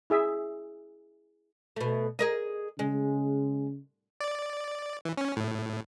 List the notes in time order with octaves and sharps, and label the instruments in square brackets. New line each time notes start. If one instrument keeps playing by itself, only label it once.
[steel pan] E4 G#4 E5
[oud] B2 A3
G#4 A#4 D#5
[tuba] C#3 [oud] G#3
[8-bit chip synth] D5
E3
C#4
A2